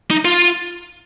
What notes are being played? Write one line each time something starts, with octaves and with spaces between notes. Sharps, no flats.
D#4
F4